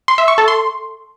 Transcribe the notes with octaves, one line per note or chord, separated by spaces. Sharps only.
C6
E5
C#6
A4
C6